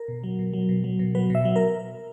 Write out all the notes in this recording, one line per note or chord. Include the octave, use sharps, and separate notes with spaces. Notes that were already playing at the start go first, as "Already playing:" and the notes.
Already playing: A#4
B2
F#3
B2
F#3
B2
F#3
B2
F#3 B4
B2 E5
F#3
A#4